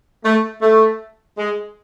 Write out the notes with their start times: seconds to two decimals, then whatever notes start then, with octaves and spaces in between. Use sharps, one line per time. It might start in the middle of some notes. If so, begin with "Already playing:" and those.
0.24 A3
0.62 A3
1.37 G#3